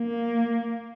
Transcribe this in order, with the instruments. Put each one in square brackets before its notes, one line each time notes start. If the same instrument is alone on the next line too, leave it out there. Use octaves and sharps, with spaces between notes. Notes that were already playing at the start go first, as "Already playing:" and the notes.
Already playing: [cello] A#3